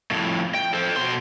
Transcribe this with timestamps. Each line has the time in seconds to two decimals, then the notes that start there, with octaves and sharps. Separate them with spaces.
0.11 F2 A2
0.55 G5
0.74 A4 C5
0.96 B2 C6